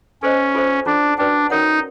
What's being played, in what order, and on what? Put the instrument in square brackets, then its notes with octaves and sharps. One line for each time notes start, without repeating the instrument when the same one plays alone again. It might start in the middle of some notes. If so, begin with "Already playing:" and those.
[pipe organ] C#4 [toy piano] A4 C5 D#5
[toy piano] F4 A4 C5 E5
[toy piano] C#4 F4 A4 [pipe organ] D4
[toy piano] C#4 F#4 B4 D5 G5 [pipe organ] D4
[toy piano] C#4 F#4 A#4 C#5 F#5 [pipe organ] D#4